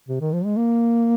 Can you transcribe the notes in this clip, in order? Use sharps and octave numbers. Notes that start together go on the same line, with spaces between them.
C3
D#3
F3
G#3
A#3